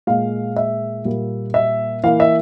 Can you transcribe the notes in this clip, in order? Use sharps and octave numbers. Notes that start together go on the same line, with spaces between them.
A#2 G#3 F5
E5
A#2 G3 A#3
E5
E3 A#3 F5
E5